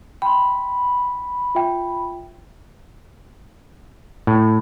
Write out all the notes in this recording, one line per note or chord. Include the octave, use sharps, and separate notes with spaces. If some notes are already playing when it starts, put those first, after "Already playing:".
G5 B5 C6
F4 E5 G5
A2